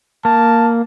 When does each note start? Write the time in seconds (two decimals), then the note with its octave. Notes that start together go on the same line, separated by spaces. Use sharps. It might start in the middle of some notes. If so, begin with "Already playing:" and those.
0.25 A#3 A5